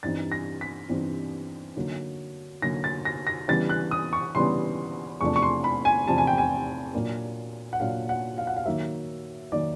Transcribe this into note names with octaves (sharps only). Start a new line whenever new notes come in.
G2 E3 G3 C4 D#4 A6
A#6
B6
G2 E3 G3 C4 D#4
D3 F#3 A#3 D#4
D3 F#3 A#3 D#4 A#6
A6
A#6
A#6
C#3 E3 G3 B3 D4 A6
F#6
D#6
C#6
C#3 E3 G3 B3 D4 C6
E2 C3 F3 A3 D4 C#6
C#6
C6
B5
G#5
E2 C3 F3 A3 D4 A5
G#5
G5
G#5
A#2 F#3 A#3 D4
F#5
A#2 F#3 A#3 D4 F5
F#5
F5
F#5
F5
D#3 F#3 A#3 D#4 E5
D#3 F#3 A#3 D#4 D5